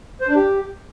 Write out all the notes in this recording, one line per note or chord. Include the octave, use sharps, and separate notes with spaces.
C5
D4
G4